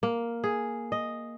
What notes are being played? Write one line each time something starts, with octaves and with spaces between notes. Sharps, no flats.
A#3
G#4
D#5